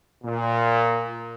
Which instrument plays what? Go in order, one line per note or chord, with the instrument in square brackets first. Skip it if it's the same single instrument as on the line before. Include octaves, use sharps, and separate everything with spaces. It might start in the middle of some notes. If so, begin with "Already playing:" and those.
[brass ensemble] A#2